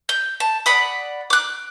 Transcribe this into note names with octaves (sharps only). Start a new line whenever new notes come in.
G6
A5
D5 F#5 B5 D#6
D6 F#6